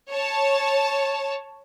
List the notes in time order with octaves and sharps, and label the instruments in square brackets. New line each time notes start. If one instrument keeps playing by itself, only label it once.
[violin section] C#5 A5